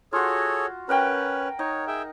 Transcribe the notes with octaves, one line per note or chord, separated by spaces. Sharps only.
F4 F#4 G#4 A4 C#5
C#4 A#4 B4 F#5 G5
D#4 C#5
G#4 E5 G5